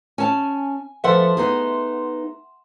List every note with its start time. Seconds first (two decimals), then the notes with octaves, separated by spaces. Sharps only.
0.18 C#4 G#5 A5
1.04 F3 A4 B4 E5 F#5 C6
1.37 B3 D#4 G#4